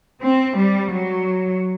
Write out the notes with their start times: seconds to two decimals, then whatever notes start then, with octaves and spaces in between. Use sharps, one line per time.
0.22 C4
0.56 G3
0.91 F#3